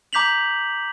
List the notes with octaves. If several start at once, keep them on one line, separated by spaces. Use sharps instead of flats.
A#5 D6 G6 B6 F7 F#7